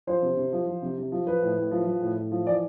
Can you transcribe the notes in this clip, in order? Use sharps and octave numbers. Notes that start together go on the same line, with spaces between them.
F3 C5
C3
C3
F3
F3
C3
C3
F3
F3 B4
A2
A2
F3
F3
A2
A2
F3
E3 D5